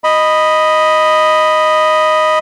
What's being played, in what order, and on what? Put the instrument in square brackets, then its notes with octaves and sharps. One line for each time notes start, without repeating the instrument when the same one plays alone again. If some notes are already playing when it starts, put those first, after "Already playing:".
[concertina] D#5 B5